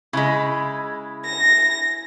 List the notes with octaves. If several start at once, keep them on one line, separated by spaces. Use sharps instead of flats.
C#3 G#3 E4 G#5 B5
A#6